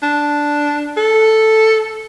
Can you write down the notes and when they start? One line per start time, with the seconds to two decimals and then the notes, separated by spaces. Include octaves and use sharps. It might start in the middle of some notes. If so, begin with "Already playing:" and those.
0.02 D4
0.97 A4